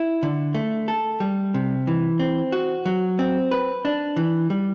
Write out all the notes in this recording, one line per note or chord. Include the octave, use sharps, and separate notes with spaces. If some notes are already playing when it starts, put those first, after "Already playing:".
Already playing: E4
D3
A3
A4
G3
C3
E3
C4
F#4
F#3
C4
B4
D4
E3
G3